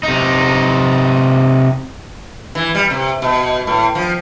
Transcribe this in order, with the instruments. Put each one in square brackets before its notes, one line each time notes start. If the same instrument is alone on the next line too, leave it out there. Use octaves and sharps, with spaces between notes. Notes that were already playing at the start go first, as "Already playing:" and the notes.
[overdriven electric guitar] C3 D#4
[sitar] E3
G3
C3
B2
A2
F3